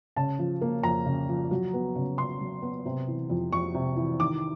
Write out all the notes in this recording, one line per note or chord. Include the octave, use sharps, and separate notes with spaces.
C#3 A5
F3
A#3
F2 A#5
C#3
F3
F#3
B3
C#3
C#3 C6
F#3
B3
C3
E3
F2
F2 C#6
C3
E3
D#3 D6